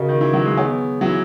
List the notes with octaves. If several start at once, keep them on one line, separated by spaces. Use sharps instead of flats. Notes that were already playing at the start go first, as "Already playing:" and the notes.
Already playing: C#3 F#4 A#4 D#5
D#3
E3
F#3
G#3
B3 G#4 C#5 G#5
F#3
E3